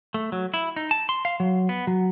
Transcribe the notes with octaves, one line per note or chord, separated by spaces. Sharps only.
A3
F#3
E4
D#4
A5
C6
F5
F#3
B3
F#3